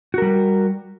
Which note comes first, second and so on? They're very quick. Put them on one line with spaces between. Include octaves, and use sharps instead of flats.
F#4 A#4 G3